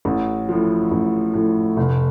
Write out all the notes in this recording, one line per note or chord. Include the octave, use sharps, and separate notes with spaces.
A1
A2 F3
A1
A2 F3
F1